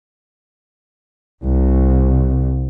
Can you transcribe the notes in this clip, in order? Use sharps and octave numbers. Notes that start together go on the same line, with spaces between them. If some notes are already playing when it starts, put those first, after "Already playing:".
C2